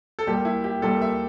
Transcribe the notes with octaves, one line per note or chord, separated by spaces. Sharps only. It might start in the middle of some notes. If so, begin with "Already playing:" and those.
A4
A#2 G3 A#3 G4
E4
G4
A#2 G3 A#3 A4
E5